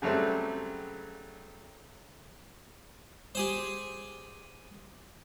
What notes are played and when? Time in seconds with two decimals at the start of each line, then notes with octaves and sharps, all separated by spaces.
0.02 C#3 F#3 G3 A3 C4
3.35 G4 G#4 C5